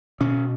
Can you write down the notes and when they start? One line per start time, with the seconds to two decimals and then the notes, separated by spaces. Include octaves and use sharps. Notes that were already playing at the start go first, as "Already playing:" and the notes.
0.20 B2 C#4